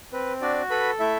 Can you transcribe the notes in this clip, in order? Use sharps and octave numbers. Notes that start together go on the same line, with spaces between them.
C4 B4
D4 F#4 D5
A4 B4 B5
A3 E4 E5